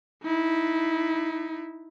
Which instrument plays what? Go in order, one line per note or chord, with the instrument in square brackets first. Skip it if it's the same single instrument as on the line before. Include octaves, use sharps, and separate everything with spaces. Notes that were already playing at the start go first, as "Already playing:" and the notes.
[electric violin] D#4 E4